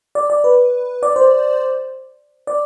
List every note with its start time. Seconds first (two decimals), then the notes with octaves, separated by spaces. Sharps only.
0.15 D5
0.30 D5
0.44 B4
1.03 D5
1.16 C5
2.47 D5